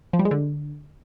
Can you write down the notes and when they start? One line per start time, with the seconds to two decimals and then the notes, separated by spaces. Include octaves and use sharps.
0.13 F3
0.19 G3
0.25 G#3
0.31 D3